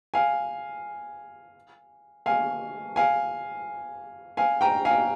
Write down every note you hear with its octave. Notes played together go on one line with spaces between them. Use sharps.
F5 G#5
F5 G#5
F5 G#5
F5 G#5
G5 A#5
F5 G#5